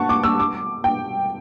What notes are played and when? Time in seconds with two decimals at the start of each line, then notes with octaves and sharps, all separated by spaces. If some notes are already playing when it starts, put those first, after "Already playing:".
Already playing: F#5 A5 C#6
0.09 D6
0.23 E6
0.40 D6
0.84 G5